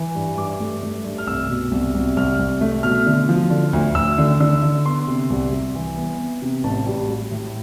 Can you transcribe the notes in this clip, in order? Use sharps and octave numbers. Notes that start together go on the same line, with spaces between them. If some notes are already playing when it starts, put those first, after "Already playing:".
Already playing: E3
G2
G2 D6
A3
A3
G2
F6
C2 E6
B2
C2
C2
C2 F6
C2
A3
B2 F6
D3
F3
D3
D2
D2 E6
D3
D3 E6
D3
B3 C6
C3
C2
C2
E3
B3
B3
C3
A1 A5
G3
G3
A2